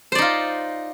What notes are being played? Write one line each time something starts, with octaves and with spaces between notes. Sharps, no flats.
D#4 F4 C5 D5